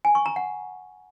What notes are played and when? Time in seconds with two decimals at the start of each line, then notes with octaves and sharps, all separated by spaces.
0.05 G#5
0.15 C#6
0.26 A#5
0.36 F#5